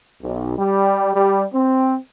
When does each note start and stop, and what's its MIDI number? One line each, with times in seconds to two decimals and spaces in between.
0.22 0.52 35
0.57 1.12 55
1.14 1.43 55
1.52 1.95 60